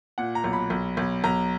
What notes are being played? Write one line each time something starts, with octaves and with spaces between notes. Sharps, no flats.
A#2 F#5
A#5
B1
B5
B1
B1
B1 A#5